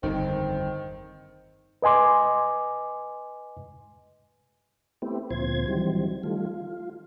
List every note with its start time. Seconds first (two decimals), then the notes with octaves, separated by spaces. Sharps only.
0.03 G1 F2 D#3 C4
1.82 B4 D#5 G#5 C6 D6
5.02 A3 B3 C4 E4 G4
5.30 D2 A#2 F3 C4 C5 G#6
5.68 D#3 E3 F#3 G3 C4
6.23 D#3 G3 A3 F4
6.46 F4